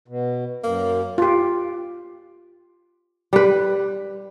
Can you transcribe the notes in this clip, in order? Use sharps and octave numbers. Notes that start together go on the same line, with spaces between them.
B2
F#2 A#3
F4 G4
G3 B4